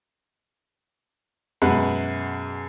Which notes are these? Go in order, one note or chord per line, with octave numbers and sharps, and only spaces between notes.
F#2 B2 G#3 B4 F#5